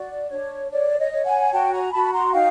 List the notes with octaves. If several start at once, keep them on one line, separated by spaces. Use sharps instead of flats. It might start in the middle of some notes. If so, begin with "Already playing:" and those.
Already playing: F#4 D5
D4 C#5
C#5 D5
C#5 D#5
C#5
F#5 G#5
F#4 G5 A5
G#5 A#5
F#4 A5 B5
A#5 C6
D#4 F5 G5